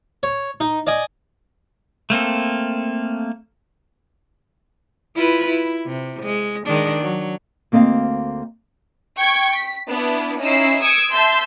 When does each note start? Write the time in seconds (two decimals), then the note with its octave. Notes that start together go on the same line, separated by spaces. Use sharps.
0.23 C#5
0.60 D#4
0.87 D5 D#5 G#5 D#6
2.10 A3 A#3 C4 A4
5.16 E4 F4 B4
5.48 E4
5.87 C3
6.23 G#3
6.66 D#3 G#3 D4
7.02 F#3
7.72 D2 A#3 C4 D#5 F5
9.17 G5 C#6 G#6
9.56 B6
9.88 B3 D4 E4
10.40 C#4 D#4 E4 E6 C7
10.81 D#6 E6 G#6 C#7 D7
11.12 E5 A5 C6 E6 G6 C7